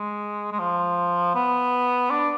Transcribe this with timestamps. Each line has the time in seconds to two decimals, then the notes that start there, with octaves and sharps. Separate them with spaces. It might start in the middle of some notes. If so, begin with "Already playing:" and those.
Already playing: G#3
0.52 G#3
0.59 F3
1.35 B3
2.10 D4